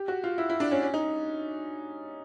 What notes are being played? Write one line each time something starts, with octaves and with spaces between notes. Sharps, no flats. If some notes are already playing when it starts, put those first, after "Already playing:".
Already playing: G4
F#4
F4
E4
E4
D4
C#4
C#4
D#4